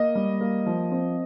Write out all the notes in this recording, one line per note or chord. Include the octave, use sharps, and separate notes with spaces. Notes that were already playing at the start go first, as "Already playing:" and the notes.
Already playing: A#3 D#5
G3
A#3
F3
C4